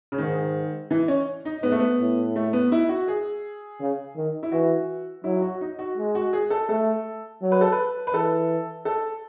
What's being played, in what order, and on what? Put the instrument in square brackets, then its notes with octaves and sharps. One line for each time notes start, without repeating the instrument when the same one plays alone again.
[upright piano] C#3
[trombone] G#2 [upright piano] D#3
[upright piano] E3
C#4
D#4
[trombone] G#2 [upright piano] B3
[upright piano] A3
B3
[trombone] A2
[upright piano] A3
B3
E4
F#4
G#4
[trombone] C#3
D#3
[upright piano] E4
[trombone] E3 [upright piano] F#4
[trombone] F#3 [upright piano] E4
[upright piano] F#4
D#4
F#4
[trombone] G#3
[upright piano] F#4
G#4
A4
[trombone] A3 [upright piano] A4
[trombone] F#3
[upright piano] B4
A4
B4
B4
[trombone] E3 [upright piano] A4
[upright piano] A4